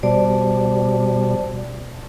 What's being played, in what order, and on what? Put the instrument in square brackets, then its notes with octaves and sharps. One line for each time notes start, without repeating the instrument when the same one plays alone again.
[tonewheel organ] B2 G3 [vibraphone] C5 D5 A5